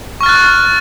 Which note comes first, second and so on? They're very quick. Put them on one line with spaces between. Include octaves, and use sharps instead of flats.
C#6 F6 A6 F#6